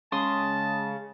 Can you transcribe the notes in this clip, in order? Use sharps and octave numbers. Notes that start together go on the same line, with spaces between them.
C#3 G#3 A5 C6 D#6